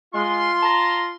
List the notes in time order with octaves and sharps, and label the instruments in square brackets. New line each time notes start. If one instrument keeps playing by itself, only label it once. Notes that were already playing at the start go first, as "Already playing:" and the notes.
[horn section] G#3 [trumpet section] F4 C6
[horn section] A5 A#5